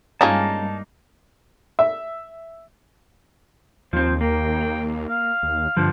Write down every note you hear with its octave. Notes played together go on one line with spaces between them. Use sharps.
G2 G#3 A#3 C#4 D#4 F4 G#4 A5
E5
D#2 F3 C4 C5
A#3 G5
F5
D#2
G2 D3 F3